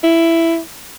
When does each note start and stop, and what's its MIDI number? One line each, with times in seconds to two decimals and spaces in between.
0.04 0.60 64